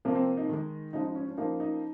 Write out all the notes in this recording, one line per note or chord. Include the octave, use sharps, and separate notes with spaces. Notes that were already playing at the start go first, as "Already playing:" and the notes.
C3 F3 A#3
C4
D#4
D#3 G#3
C#3 F3 G#3 D#4
D#4
C#4
C#4
C#3 F3 A#3 D#4
D#4